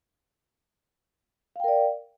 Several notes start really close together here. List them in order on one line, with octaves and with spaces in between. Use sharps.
F5 G5 A#4 D5